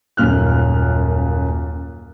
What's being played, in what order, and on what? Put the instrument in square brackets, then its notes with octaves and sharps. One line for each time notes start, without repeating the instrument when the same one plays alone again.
[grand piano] D#1 F#2 A#2 F6 F#6